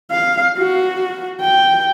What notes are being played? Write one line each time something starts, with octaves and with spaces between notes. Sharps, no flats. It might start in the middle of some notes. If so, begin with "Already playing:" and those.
F5
F#4
G5